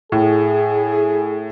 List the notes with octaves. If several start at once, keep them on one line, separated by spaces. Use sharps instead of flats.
A2 G#4